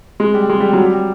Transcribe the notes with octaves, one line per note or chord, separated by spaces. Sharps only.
G#3
G3
G#3
G3
F#3
G3